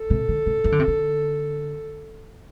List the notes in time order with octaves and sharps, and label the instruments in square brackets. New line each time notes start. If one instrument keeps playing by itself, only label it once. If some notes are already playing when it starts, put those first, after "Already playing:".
Already playing: [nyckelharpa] A4
[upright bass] C3
D3
C3
E3
D3
C3
D3